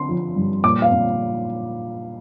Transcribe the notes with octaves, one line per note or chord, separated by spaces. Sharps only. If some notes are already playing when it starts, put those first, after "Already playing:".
Already playing: D3 C6
F3
G2
A#2 D6
F5
A#2